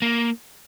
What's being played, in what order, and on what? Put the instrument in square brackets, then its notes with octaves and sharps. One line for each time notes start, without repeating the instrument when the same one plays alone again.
[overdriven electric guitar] A#3